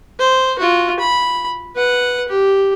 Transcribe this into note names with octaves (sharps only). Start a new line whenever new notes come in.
C5
F4 F#4
B5
B4 F#5
G4